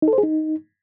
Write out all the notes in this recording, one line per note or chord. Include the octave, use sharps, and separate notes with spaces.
D#4
A4
C5
G#4
D#4